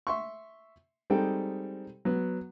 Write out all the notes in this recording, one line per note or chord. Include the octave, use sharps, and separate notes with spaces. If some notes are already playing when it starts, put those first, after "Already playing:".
E5 C6 C#6
G3 G#3 C4 D#4 A4 G5
F#3 B3